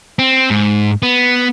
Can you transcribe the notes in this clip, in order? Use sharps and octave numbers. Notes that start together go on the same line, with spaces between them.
C4
G#2
B3